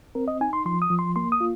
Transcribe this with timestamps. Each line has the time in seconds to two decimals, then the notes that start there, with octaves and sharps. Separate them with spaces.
0.15 C4 A#4
0.28 D#5
0.41 D#4 G#5
0.53 C6
0.66 F3 C6
0.82 D#6
0.90 F3
0.99 C6
1.16 A#3 C6
1.32 D#6
1.41 F4